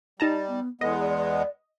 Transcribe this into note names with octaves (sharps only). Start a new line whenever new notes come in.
G3 D#4 A5 A#5
B3
E2 G#3 B3 A4 D#5
D5